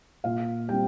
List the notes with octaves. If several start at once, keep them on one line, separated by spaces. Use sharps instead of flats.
A#2 F5
G3 C4 G5